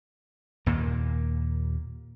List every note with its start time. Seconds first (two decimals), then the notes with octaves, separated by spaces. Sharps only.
0.66 D#2 A#2 A#3